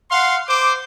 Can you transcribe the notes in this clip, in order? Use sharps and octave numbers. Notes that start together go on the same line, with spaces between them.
F5 F#5 C6
C5 D6